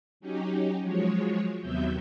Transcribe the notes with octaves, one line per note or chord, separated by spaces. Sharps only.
F#3 C#4 D#4 G4
F3 F#3 G#3 C#5
D#2 C3 F#3 B3 E5 G6